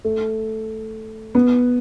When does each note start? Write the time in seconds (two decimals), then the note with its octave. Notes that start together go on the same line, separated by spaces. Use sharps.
0.05 A3
1.35 B3